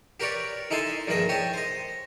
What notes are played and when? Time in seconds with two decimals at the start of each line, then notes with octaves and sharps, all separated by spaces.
0.20 G4 A#4 B4 C#5 D5
0.70 D#4 E4 A4 G#5 A5 C6
1.07 A#1 G2 D#3 G#4 D#5
1.29 G4 C#5 G#5 A5
1.53 C5 D#5